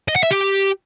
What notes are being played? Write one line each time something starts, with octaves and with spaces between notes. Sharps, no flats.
D#5
F#5
E5
G4